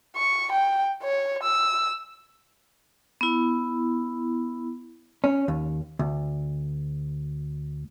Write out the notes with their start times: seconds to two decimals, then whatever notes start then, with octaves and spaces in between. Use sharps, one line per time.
0.16 C#6
0.52 G5
1.03 C#5
1.43 E6
3.21 B3 E4
5.24 C#4
5.48 D#2
5.99 D2